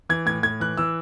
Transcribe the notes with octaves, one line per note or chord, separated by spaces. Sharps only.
E3 G#6
A2 G#6
A2 G#6
E3 F#6
E3 E6